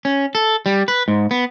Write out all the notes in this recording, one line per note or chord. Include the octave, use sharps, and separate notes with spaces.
C#4
A4
G3
B4
G#2
B3